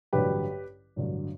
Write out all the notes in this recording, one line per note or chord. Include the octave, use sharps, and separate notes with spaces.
A1 G2 D3 F#3 G4 B4
A1 G2 D3 F#3